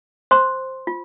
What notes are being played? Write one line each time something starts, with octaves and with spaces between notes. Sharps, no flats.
C5 C6
F4